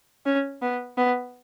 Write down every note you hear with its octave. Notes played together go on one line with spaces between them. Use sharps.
C#4
B3
B3